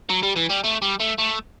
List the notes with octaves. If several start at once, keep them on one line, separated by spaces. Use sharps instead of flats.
F#3
G3
E3
G3
A3
G3
A3
A3